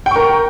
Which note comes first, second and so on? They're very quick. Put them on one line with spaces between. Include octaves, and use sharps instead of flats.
G5 C#6 A#4